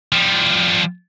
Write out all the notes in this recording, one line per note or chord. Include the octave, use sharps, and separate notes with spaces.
F3 G3